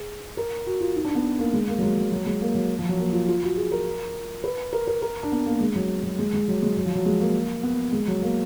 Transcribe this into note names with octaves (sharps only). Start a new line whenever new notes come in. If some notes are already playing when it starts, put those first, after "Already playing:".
Already playing: G#4
A#4
F#4
F4
D#4
D4
B3
A#3
G#3
A#3
F#3
G#3
F#3
F#3
G#3
A#3
F#3
F3
F#3
A#3
F4
F4
F#4
G#4
A#4
B4
A#4
A#4
A#4
D4
B3
A#3
G#3
F#3
F#3
G#3
G#3
F#3
G#3
F#3
F3
F#3
G#3
A#3
B3
G#3
F#3
A#3